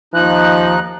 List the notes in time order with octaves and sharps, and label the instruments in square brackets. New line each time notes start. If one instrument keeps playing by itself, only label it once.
[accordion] D#2 D#4 F#6 [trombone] F3